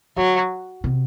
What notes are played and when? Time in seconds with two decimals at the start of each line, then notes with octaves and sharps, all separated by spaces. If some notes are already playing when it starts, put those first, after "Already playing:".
0.17 D3 F#3
0.84 C3